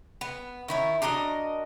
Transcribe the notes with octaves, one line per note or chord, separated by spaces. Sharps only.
B3
D#3 E4 C#5
D4 F#4 A#4 D#5